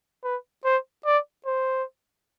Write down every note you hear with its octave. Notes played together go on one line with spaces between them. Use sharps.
B4
C5
D5
C5